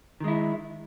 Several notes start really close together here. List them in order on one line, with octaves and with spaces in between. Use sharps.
D#3 G#3 E4